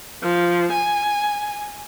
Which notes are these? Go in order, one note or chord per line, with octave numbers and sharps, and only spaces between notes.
F3
G#5